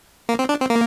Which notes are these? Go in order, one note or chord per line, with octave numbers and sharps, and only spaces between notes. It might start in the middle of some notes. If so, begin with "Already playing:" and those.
A#3
C4
D4
C4
A#3